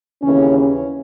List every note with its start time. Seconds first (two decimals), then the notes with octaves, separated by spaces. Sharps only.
0.22 D#2 C#3 E3 C#4
0.58 C#4